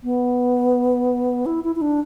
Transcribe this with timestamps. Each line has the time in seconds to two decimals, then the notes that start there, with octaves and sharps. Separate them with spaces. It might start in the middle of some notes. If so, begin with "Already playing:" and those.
0.04 B3
1.46 E4
1.64 E4
1.76 E4
1.81 D4